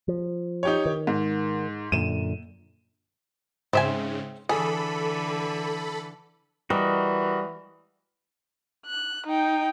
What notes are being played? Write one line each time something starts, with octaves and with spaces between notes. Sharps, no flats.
F3
D#4 G4 C#5
D#3
G#2
F#2 A#2 D3 D#7 E7
G#2 C#3 C4 E5 G#5
D3 E3 G#4 A4 B5
E3 G3 F#4 A#4 D#5
F#6
D#4 G5